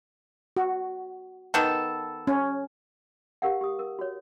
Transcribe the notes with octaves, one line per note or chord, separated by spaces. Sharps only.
F#4
D#3 B3 A4
C#4
G4 A#4 F5 F#5
G4 D#6
A#4
F#4 C#5